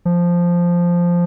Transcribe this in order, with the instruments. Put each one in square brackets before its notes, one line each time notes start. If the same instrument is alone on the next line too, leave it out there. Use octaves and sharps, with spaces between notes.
[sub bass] F3